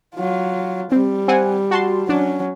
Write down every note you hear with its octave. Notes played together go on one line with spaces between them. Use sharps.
F#3 F4
G3 C4
C4 F#5 G#5
F#4 A5 C6
F#3 C#4 D4